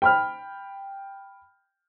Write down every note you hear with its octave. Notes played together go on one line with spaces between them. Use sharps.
G5 B5 F6